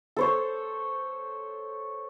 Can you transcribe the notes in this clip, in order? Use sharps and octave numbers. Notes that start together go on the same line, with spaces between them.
A4 C5 C#5